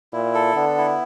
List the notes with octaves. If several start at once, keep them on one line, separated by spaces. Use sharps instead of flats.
A#2 E4
A4
D3 B3
E4